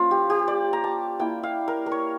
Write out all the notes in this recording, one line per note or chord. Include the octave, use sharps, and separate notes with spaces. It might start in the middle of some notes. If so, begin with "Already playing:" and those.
Already playing: F3 A#3 C#4 F4
G4
G4
D5
A#5
A5
A#3 E4 G5
F5
A#4
A#4
C#5